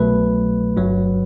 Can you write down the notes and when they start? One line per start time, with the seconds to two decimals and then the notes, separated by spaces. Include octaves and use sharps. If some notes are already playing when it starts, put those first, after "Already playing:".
Already playing: C2 B2 F#3 A3 B4
0.77 G1 G2 F#3